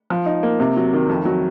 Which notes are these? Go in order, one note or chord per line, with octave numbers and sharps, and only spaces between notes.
F3
D#4
A#3
C3
F#3
D#3
F2
F#3